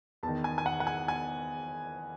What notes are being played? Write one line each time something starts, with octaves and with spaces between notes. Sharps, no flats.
E2 D#3 A5
G#5
G#5
F#5
F#5
G#5
G#5